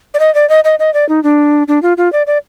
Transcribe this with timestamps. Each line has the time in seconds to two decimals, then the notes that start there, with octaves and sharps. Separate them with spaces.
0.14 D5
0.20 D#5
0.35 D5
0.49 D#5
0.64 D#5
0.79 D#5
0.94 D5
1.09 D#4
1.23 D4
1.68 D4
1.83 F4
1.97 F4
2.13 D5
2.27 D5